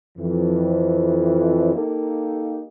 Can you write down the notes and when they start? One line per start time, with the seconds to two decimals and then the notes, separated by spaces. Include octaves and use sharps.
0.18 F2 E3
1.75 A#3 D#4 G4 A4